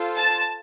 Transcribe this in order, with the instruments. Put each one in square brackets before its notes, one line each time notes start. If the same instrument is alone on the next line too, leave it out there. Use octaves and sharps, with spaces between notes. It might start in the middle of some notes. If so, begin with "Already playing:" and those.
Already playing: [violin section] F4 A4 C5
[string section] A5